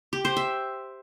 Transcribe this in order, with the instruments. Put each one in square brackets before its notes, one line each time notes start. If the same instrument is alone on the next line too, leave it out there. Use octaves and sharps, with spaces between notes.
[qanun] G4
C5
E5